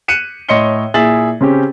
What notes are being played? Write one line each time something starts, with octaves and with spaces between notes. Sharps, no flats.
F#6 C#7 D#7 E7
A2 C#5 D#5 C6 C#7 G7
A#2 E4 G#4 E5 A6 F#7
C#3 C4 C#4 G4